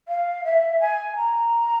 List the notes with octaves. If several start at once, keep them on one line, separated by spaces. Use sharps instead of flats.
F5
E5
G#5
A#5